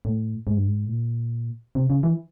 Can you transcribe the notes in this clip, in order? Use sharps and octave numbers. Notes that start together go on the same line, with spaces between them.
A2
G#2
G2
G#2
A2
A#2
C3
C#3
E3